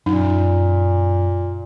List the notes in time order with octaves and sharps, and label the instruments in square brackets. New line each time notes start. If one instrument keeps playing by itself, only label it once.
[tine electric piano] F#2 [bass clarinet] A#2 [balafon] D#4